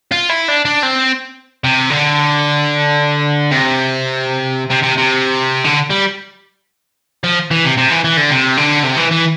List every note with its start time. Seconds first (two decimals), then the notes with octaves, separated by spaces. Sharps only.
0.12 F4
0.29 E4
0.48 D4
0.65 D4
0.83 C4
1.64 C3
1.90 D3
3.51 C3
4.70 C3
4.83 C3
4.98 C3
5.64 D3
5.90 G3
7.24 F3
7.51 E3
7.65 C3
7.78 C3
7.91 E3
8.04 E3
8.17 D3
8.30 C3
8.57 D3
8.84 C3
8.97 E3
9.12 E3